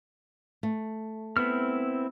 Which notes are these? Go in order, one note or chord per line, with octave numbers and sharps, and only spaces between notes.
A3
B3 C4 E4 F6